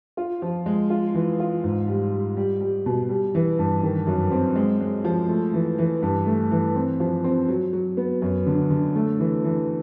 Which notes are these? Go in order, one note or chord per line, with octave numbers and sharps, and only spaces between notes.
F4
F3
G#3
F4
E3
F4
G#2
G3
G3
G3
G3
B2
G3
E3
G2
D#3
F#2
C4
G#3
G#3
F3
A3
E3
E3
G2
A3
E3
C4
F3
C4
F#3
F#3
B3
F#2
D3
D3
A3
E3
E3